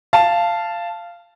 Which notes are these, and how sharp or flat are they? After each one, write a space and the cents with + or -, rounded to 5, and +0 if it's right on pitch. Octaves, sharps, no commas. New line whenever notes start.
F5 -15 A5 +0